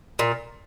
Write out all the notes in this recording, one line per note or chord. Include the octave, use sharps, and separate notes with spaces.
A#2